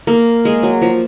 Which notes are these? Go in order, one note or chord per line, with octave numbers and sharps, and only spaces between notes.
A#3
G#3
F#3
F3